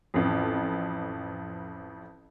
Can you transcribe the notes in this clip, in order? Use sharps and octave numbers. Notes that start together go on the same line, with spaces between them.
A1 F2